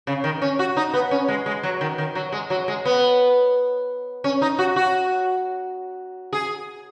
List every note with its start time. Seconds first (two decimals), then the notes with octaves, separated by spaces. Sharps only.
0.07 C#3
0.24 D#3
0.42 C#4
0.59 F#4
0.77 D#4
0.94 B3
1.11 C#4
1.28 G#3
1.46 G#3
1.63 F#3
1.81 D#3
1.98 D#3
2.15 F#3
2.32 G#3
2.50 F#3
2.68 G#3
2.85 B3
4.24 C#4
4.42 D#4
4.59 F#4
4.76 F#4
6.33 G#4